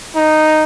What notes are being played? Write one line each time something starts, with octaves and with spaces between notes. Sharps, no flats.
D#4